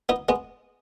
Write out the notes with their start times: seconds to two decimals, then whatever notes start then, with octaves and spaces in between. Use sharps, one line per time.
0.09 B3 D#4
0.29 G#3 B3